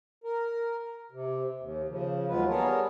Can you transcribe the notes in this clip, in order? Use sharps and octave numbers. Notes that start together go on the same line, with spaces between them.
A#4
C3
D#2
C#3 F3
D#2 F#3 G#3 F4 B4
G3 B3 G#4 A#4 C#5 A5